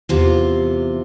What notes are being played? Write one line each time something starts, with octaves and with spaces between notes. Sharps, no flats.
E2 C3 F4